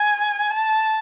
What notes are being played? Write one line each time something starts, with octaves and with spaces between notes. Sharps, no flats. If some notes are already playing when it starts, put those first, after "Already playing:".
Already playing: G#5
A5